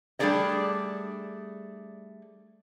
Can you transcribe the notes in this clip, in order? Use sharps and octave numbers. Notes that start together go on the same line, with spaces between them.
G3 A3 D4 G#4 D5 D#5